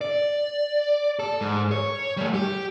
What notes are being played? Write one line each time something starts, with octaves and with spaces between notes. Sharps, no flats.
D5
A4
G#2
C#5
G3 A3
G4